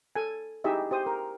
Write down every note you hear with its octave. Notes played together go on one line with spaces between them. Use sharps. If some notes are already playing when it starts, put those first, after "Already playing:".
A4 G#5
D#4 E4 G4 G#4 D#5 E5
G4 C5 D#6
A#4